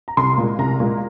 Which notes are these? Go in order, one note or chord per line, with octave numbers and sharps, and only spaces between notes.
A#5
C2 C6
A#2 G#3
C2 A#5
A#2 G#3